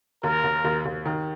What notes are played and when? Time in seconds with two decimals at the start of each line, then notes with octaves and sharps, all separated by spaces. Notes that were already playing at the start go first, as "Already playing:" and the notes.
0.23 D#2 A#4
0.44 D#2
0.64 D#2
0.85 D#2
1.06 D#3